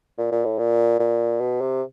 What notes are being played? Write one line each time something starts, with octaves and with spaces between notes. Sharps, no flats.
A#2
A#2
A2
A#2
A#2
B2
C3